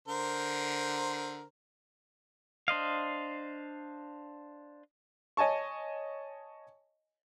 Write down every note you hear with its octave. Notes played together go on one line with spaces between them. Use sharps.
D3 A#4 C5
D4 C5 D#5 F5
C#5 D#5 G#5 A5 C#6